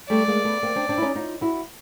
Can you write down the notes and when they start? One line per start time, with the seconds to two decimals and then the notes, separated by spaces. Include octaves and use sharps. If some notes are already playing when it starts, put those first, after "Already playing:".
0.10 G3 A3 D5
0.28 G#3 A#3
0.45 A3 B3
0.63 A#3 C4
0.76 C4 D4
0.89 C4 D4
0.98 E4
1.02 C#4 D#4
1.15 D#4 F4
1.41 E4 F#4